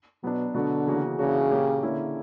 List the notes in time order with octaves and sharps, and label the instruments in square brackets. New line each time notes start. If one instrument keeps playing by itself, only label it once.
[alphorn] B2 [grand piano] F#3 B3 D4
[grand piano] B2 F#3 B3 F#4 [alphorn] D3
[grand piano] C#3 E3 A#3 C#4 F#4
[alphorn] C#3 [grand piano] E3 A#3 D4 F#4
[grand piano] A#2 A#3 C#4 G4
D3 A#3 C#4 E4